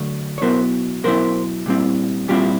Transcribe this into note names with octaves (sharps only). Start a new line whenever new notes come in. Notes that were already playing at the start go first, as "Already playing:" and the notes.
Already playing: D3 F#3 A3
C#5
B2 F#3 B3 E4 A#4 C5
B2 F#3 B3 E4 A#4 C5
A#2 G3 C4 E4
A#2 G3 C4 E4 F4 G4